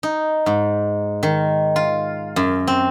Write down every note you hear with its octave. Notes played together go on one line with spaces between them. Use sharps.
D#4
G#2
D#3
F4
F#2
C4